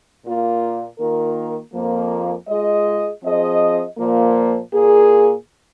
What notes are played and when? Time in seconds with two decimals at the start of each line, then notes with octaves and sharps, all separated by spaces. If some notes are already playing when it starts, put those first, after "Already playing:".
0.25 A#2 A#3 F4
0.99 D#3 A#3 F4 A#4
1.74 F2 F3 A#3
2.49 G#3 F4 G#4 D#5
3.23 F3 C4 G#4 D#5
3.98 A#2 F3 A#3
4.73 A#2 A#3 G#4